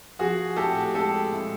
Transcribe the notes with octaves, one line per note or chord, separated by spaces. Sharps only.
F3 F#4 G#4
A2 G4 A4
G#3 G4 A4
A2